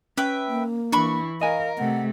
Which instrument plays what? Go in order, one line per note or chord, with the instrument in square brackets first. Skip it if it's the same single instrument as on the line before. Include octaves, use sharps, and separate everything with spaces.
[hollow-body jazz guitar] C#4 [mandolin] B4 E5 G5
[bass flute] A#3
[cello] E3 E4 [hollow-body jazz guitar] D4 [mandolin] B5 C#6
[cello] A#4 [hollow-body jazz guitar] D#5 G#5 [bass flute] F5
[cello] C3 A3 [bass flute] F#5